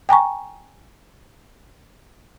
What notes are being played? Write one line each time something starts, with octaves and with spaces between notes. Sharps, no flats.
G5 G#5 A#5 C#6